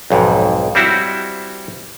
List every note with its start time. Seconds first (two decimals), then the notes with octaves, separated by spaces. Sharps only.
0.10 B1 F2 G#2
0.75 G3 C4 E4 F#4